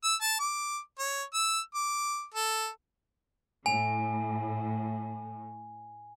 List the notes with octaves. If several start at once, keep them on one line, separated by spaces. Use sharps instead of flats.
E6
A5
D6
C#5
E6
D6
A4
A2 G#5